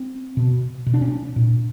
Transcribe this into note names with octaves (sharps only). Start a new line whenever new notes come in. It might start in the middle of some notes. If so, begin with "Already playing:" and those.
Already playing: C4
B2
B2
D4
C#4
D4
A#2